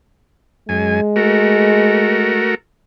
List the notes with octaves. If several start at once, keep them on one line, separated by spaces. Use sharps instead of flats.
F#2 G#3 G#5
A3 F#4 A#4